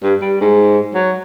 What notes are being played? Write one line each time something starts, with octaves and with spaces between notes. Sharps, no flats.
G2
G3
G#2
F#3